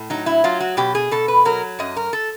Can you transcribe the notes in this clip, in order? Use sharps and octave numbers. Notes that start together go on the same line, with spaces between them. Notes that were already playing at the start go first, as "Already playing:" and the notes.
Already playing: A2
F#3 D#4
E4
F#3 F4
F#4
B2 G4
G#4
B2 A4
B4
F#3 A#4
F#2 D#5
A#4
A4